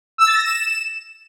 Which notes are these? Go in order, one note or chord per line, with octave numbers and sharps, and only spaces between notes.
E6
A6
A#6
E7